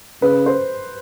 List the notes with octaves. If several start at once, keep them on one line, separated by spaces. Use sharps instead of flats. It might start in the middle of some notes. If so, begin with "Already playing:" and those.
C#3 B4
C5